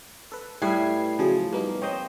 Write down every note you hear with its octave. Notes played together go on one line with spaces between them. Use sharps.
A4 B4
A2 G3 A3 B4 G#6 C7
C#3 F3 F#3 G#4
G3 A#3 B3 D#4
C4 C5 C#5 D#5